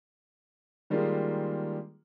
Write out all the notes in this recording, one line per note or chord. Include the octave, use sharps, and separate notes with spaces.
D#3 G3 G#3 A#3 F4